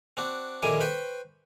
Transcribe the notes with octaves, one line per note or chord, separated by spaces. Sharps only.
C4 D4 F#4
A#1 D3 D#3 G3 E4 G#5
B4 C5 G5 B5 C#6